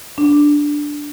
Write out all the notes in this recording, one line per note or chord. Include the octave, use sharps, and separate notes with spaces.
D4